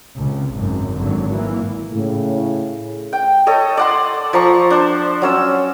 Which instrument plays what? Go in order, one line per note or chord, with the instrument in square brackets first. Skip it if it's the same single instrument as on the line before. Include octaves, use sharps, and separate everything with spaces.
[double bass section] C#2 C3
G#1 F#2
G#1 D3 F#3
E3 A#3
[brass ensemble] A2 C#3
[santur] G5
A4 C#5 D#5
D5 F#5 C6
F3 A#5 C#6
D4 C5
F#3 C#4 E6